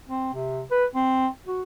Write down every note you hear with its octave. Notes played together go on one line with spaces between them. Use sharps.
C4
C3
B4
C4
F#4